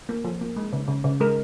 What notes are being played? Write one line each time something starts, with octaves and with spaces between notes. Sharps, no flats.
A#3
F3
A#3
G#3
C#3
C#3
C#3
G#3 A#4